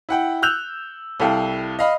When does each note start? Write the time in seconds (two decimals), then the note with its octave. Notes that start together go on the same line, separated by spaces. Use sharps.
0.09 E4 F#5 G5
0.42 E6 F#6 G6 F7
1.20 C2 E4 A4 F5 G5
1.79 D#5 F5 B5